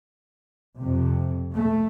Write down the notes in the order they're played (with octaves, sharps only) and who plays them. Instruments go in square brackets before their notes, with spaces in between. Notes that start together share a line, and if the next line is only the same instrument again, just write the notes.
[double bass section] F2 C3
A3